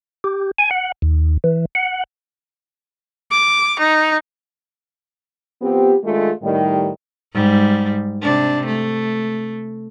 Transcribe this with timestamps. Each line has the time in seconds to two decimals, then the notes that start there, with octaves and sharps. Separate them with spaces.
0.24 G4
0.58 G#5
0.71 F#5
1.02 D#2
1.44 E3
1.75 F#5
3.31 D6
3.79 D#4
5.62 F3 B3 C4 G4
6.04 D#3 G#3 A3 D4 F4 G#4
6.42 A2 D#3 G3
7.33 G#2 G3
8.22 C3 D4
8.66 A3